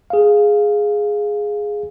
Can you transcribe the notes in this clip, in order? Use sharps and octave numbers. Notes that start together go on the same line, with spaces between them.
G#4 F5